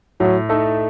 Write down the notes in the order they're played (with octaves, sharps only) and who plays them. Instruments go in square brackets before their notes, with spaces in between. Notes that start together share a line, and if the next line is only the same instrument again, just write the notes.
[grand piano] A2 [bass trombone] F#3
[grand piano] A3 D#4 A4